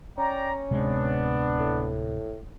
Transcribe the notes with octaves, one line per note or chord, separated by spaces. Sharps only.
C#4 D5 G5 A#5
D1 C3 G#3 B3 D4
A2